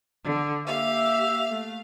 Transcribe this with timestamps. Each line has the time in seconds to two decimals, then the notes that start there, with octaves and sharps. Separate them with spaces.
0.24 D3
0.67 A#3 G4 E5 F5
1.50 A3